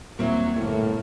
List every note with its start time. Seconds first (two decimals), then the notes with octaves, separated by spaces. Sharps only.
0.19 D#1 A#2 F#3 A#3 C4 E4
0.56 G1 A2 A3 A#3